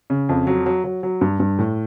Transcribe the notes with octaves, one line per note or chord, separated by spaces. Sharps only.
C#3
F2
F#3
F#3
F#3
F#3
G2
G2
A2